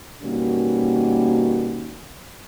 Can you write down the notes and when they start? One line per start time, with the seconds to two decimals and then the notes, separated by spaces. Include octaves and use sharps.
0.23 B2 D#3 G3 A#3 C#4 F#4